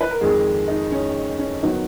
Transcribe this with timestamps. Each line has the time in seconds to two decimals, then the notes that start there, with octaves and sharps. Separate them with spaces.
0.01 B4
0.11 A#4
0.21 F2 D#3 G#3 G#4
0.68 D#4
0.92 C#4
1.39 C#4
1.62 D#3 F#3 B3 D#4